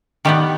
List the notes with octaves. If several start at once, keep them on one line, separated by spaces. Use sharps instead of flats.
D#3 G3 B3 G4